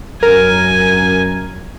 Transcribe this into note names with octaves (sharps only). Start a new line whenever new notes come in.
F#2 A#4 G#5